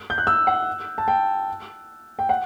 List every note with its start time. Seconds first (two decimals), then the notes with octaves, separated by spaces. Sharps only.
0.10 G6
0.18 F#6
0.27 E6
0.47 F#5
0.98 A5
1.08 G5
2.19 G5
2.29 F#5